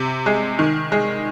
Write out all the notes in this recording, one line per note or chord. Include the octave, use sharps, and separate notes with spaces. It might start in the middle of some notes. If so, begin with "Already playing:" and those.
Already playing: C3
G#3
D#3
G#3